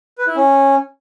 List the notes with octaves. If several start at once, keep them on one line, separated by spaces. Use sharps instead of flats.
B4
E4
C#4